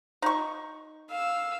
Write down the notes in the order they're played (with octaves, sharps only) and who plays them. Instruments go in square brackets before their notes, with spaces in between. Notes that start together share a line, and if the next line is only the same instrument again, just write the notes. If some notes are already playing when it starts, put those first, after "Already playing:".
[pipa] D#4 C#6
[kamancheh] F5 E6